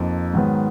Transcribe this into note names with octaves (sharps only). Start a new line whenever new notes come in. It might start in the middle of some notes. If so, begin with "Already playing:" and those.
Already playing: F2 F3 A#3 D#4
G#2 D#3 F#3 B3